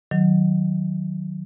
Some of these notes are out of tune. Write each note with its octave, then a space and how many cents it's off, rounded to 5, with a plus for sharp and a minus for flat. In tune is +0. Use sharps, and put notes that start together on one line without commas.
D#3 -5 F#3 +0